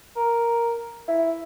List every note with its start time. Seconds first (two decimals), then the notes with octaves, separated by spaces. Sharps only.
0.16 A#4
1.08 E4